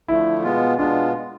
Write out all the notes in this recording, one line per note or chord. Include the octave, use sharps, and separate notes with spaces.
D3 F3 A3 E4
B2 G#3 B3 F4
B2 G#3 B3 D4 F4